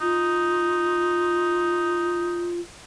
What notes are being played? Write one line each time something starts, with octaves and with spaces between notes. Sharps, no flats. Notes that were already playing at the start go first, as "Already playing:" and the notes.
D#4 F4